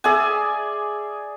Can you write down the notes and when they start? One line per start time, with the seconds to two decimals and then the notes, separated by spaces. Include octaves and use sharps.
0.04 G#4 D5 E5 G#5